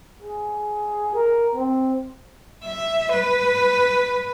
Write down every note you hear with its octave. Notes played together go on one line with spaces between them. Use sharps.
G#4
A#4
C4
E5
B4